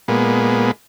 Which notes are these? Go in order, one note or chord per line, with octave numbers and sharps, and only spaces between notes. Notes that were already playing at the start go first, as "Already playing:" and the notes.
A#2 G#3 B3